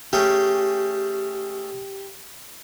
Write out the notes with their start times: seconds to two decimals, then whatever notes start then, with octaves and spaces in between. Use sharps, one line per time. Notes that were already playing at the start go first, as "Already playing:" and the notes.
0.13 A3 C#4 G4 G#4